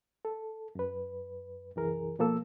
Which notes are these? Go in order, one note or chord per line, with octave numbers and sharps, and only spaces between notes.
A4
F#2 B4
C2 F#2 E3 G#4 A#4
B2 F3 A#3 A4 E6